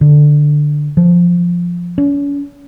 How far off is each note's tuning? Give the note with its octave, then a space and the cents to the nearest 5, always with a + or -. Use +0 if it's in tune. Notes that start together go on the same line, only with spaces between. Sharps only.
D3 +10
F3 +0
C#4 +40